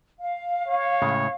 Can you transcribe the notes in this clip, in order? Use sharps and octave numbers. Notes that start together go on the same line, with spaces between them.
F5
C#5
A2 C#3 G#3